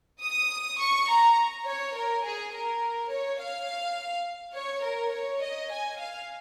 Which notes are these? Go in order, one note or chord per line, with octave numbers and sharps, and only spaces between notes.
D#6
C#6
A#5
C#5
A#4
G#4
A#4
C#5
F5
C#5
A#4
C#5
D#5
G#5
F5